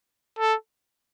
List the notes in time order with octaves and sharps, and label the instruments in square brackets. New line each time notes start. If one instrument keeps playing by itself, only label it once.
[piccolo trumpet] A4